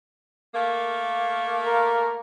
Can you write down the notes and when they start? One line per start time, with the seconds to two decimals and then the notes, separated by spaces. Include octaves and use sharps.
0.55 A3 A#3
1.64 A#4